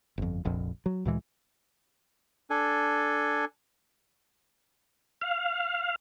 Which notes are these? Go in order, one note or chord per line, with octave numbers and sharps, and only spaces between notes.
G1 F2
F1 A#1 F2
F#3
D2 A#2 E3 G#3
D4 A4 G#5
F5